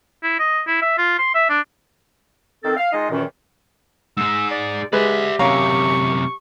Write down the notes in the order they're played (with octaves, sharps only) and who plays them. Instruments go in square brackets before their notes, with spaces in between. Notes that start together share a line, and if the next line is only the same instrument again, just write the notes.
[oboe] E4
D#5
E4
E5
F4
C6
E5
D4
[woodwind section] D#3 C4 A4
F5
D#3 G#3 D#4 F4 D#5
C#2 F#2 A#2 D#3 E3 C#4
[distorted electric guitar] G#2 G#3 [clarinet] E6
[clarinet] D5
[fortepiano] G#3 B4 [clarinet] G4 [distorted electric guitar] D5 E5
[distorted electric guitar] F#2 C3 [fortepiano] C#4 F5 A#5 [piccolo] C#6